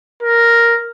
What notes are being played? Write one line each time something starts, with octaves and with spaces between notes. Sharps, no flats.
A#4